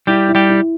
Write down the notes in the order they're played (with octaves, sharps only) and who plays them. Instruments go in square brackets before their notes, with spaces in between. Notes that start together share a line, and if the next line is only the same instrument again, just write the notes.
[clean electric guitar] G3 G4 [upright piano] E4
[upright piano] E4
[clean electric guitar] G3 G4
[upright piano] E4